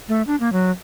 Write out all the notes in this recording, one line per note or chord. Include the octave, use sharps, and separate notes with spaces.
A3
D4
A#3
F#3